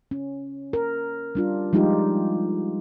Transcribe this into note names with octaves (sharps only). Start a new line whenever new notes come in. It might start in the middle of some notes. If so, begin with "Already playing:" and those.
C#4
A#4
G3 D4 F4
F3 G3 G#3 D#4 F4 G4